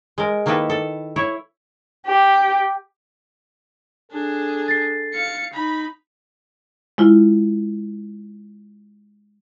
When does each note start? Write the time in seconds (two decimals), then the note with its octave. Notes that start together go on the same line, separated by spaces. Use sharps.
0.18 G#3 A#4
0.46 D#3 A#3 E4 A4 B4
0.70 A4
1.16 E4 C#5
2.06 G4
4.12 D4 G#4 A4
4.68 A6 C7
5.14 F5 C#7
5.53 D#4 B5
6.98 G#3 E4 F4